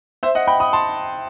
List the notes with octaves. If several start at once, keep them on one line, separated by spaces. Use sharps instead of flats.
C5 E5
D#5 F#5
G5 B5
B5 D#6
A5 C6